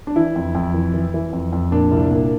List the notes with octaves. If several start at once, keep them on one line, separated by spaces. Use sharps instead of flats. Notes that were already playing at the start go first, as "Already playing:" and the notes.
D4
E3 E4
F2
F2
E3
E3
E3
F2
F2
A#2 D4
C2
A#2